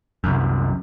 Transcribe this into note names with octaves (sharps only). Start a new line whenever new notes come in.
C2 F#2